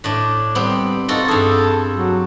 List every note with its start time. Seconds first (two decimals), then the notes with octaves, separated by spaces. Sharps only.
0.04 A2 D4
0.55 G3 B3 C4
1.08 D#4 F4 F#4 A4
1.28 G2 G#4 A4
1.96 F#3